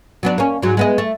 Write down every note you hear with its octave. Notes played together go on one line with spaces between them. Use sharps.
F#3 B3 D4
A#3 C#4
G#2 F#3
G#3 B3 D#5
A3